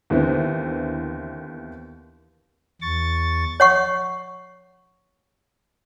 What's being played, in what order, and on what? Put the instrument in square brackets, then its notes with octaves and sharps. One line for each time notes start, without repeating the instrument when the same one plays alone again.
[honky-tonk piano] D#2 D3 E3 B3 C4
[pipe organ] E2 C#6 A6
[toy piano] C#5 F#5 C#6